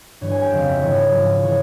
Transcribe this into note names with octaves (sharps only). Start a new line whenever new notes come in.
G2 E3 C#5
G#5
G5
F2 C#3 F3 F5
E5
G#2 E3 C#5
G#2 F3
E3 C#5